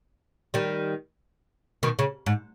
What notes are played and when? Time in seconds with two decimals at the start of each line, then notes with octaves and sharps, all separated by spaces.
0.54 D#3 G3
1.83 B2 D#3
1.99 C#3
2.26 G#2